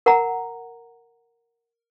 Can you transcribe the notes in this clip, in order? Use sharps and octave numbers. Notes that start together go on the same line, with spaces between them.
A#4 F#5 A#5